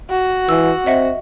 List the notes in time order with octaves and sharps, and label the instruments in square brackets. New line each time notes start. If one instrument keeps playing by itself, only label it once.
[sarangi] F#4
[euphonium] E3 [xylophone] E6
[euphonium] C4 [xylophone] D#5 E5 F#5